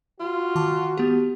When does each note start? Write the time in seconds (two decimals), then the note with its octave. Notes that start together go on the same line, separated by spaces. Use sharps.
0.20 F4 F#4
0.55 D#3 A5 D6
0.98 B3 G4